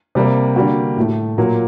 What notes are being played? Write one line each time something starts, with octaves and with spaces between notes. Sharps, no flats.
C3 G3 A#3
D3 G3 A#3 F#4
A2 A3
A#2 F#3 A#3